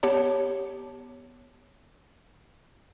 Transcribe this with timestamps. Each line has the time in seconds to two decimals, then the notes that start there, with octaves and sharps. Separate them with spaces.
0.03 B3 G4 C#5 A5